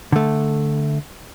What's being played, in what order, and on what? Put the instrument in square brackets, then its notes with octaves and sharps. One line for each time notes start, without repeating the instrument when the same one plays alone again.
[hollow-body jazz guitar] D3 A3